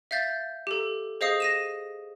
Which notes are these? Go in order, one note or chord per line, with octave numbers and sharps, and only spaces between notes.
E5 F5 G6 A6
G4 A4
G#4 C5 D#5 F5 D#6 C7
A#6 D#7 E7